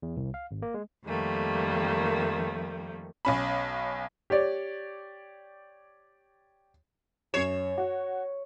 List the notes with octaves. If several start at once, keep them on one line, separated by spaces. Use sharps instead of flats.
E2
C2
F5
G#1
A#3
G#3
F2 D#3 F3 G3 A3 A#3
B1 C#4 B5
G4 C#5 D5
F#2 C#5 C7 E7
F#4